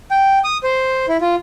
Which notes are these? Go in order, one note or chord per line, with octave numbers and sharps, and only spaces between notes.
G5
D#6
C5
E4
F4